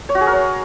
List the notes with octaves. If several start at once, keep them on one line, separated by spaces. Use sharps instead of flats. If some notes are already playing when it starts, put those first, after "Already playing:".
C#5
F#4
G#4
A#4
C#5